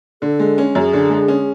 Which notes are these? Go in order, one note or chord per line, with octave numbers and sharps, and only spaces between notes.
D3 A4
G#3
C#4
F#2 G#4
D3
G#3
C#4